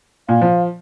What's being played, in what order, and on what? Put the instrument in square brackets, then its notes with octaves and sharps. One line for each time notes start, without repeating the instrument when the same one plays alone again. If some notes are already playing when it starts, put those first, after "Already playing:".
[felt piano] A#2 [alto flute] F5
[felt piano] F3